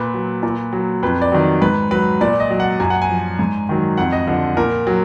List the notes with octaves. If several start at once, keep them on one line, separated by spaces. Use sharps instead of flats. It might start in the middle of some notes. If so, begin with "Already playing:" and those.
Already playing: A#2 B4
F#3
A#2
F#3
F2 B4
D5
D#3 F#3
G#2 B4
F#3 B4
A#2 D5
D#5
F#3
F#5
F#2 G#5
F#5
G#5
F3
G#2
D#3 F#3
F2 F#5
D#5
D3 F3
A#2 A#4
F#3